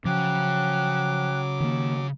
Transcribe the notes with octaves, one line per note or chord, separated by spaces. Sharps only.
C#3 F3 F#3 G5 D6 F#6
D#3 A#3